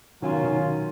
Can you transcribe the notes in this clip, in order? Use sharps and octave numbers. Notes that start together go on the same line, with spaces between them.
B2 D#3 F#3 C#4 F4
D#3
D#3